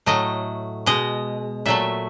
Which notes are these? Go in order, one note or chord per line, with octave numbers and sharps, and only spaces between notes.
A2 F#3 A3 D#5
B2 G#3 D#5
A#2 F#3 A3 E5